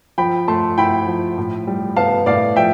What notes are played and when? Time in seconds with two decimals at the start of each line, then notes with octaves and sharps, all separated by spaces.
0.18 F3 G5 B5
0.48 A3 A5 C6
0.78 E4 G5 B5
1.07 F3
1.38 A2
1.67 G3
1.96 B3 F5 A5
2.26 A2 D5 F5
2.56 F3 E5 G5